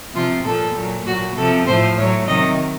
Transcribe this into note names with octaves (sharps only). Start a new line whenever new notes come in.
C3 F3 F4
A#2 F3 A4
A#2 F#3
A#2 F#3 F#4
C3 F3 A4
A2 F3 C5
A2 F#3 C#5
C3 D#3 F#3 D#5